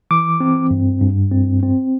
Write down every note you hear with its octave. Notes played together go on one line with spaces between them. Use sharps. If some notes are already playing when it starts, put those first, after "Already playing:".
E3 D6
C4
G2
G2
C4
C4